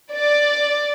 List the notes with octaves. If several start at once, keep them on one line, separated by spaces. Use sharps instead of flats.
D5